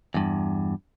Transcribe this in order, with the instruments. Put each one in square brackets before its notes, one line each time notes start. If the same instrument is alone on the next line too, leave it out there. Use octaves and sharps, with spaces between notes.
[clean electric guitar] E2 G2